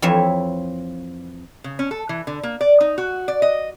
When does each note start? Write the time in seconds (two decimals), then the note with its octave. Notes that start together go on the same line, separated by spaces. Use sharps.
0.02 F2 E3 F3 C#5 E5
1.64 C#3
1.79 C#4
1.91 A4
2.09 E3
2.27 D3
2.43 A#3
2.61 D5
2.81 D#4
2.98 F#4
3.28 D5
3.42 D#5